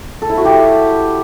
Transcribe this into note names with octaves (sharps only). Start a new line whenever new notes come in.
A4
E4
F#4
G4